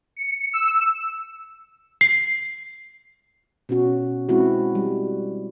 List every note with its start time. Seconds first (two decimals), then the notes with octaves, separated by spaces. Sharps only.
0.16 C#7
0.53 E6
2.01 C7
3.69 B2 C#4 F#4
4.29 G#3 C4 E4 F#4
4.75 G3